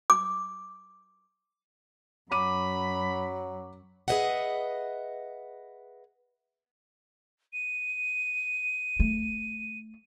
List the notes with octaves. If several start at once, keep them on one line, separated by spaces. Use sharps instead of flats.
D6
F#2 F#3 B5 D6 D#7
G#4 B4 C5 D#5 E5 F#5
D#7
A3